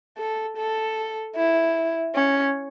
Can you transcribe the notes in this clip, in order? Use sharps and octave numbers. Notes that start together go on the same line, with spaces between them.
A4
A4
E4
C#4